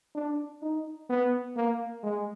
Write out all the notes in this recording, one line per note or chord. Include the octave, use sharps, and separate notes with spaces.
D4
D#4
B3
A#3
G#3